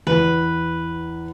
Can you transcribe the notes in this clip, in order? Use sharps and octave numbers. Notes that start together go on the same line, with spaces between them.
E2 B4